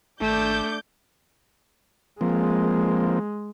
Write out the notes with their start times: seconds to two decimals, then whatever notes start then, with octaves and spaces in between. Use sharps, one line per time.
0.21 G#1 A3 D4 D6 G6
2.21 F3 G#3 A#3 C4